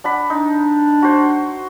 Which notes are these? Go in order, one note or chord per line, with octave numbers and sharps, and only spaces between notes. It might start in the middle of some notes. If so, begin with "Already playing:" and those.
D4 F#5 B5
D4 D#4
F#4 C5